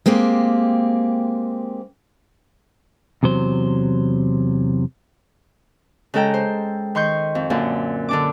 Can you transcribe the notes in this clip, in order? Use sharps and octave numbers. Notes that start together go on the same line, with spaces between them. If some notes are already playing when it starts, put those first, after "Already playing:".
G#3 A#3 C4 G4
E2 C3 F#3 C5
C#3 G#3 A4 G5 A#5
C5
D#3 C6 C#6 G6
F2
F#2 A#2 D3
D3 D4 D6